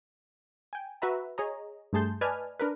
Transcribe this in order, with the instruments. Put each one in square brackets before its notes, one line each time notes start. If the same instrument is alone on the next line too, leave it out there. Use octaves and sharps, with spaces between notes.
[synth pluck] G5 G#5
F#4 B4 E5 A#5
G#4 C#5 D#5 A#5
G2 A3 G#4 A5 C6 G6
B4 D5 D#5 G#5 A5 F6
D4 A#4 B4